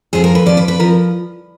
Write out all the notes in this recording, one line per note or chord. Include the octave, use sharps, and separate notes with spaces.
F2 F3 G#4
A#4
B4
F2 F3 D5
B4
B4
F3 A#4